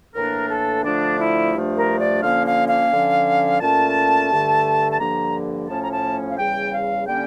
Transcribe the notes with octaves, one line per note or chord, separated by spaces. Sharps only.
A2 E3 A#3 D4 A#4
A4
D3 F3 A3 D4
E4
G2 F3 A3 D4
A#4
D5
D3 F3 A#3 C#4 F5
F5
F5
D3 F3 C#4
A#2 A3 C#4 A5
G2 D3 A3
A5
G2 D3 F3 A#3 A#5
A2 F3 A3 C#4 A5
A#5
A5
F5
E2 C#3 G3 G5
F5
D3 G3 A#3 C#4 G5